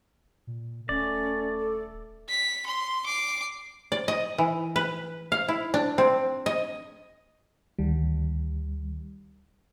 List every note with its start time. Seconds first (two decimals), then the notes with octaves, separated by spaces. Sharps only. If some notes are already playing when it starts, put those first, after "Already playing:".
0.47 A#2
0.89 D#1 A3 C#4 D5
1.59 A4
2.29 B6
2.66 C6
3.06 D6 C7
3.92 D5
4.08 D#5
4.38 E3
4.76 B4
5.32 F5
5.48 E4
5.74 D4
5.98 C4
6.46 D#5
7.79 D2 D#3 G3